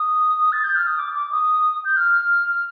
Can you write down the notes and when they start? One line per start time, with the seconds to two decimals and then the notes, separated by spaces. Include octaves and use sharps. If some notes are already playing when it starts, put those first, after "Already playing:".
Already playing: D#6
0.52 A6
0.64 G6
0.75 F6
0.87 D#6
0.98 D6
1.16 D6
1.32 D#6
1.85 G6
1.96 F6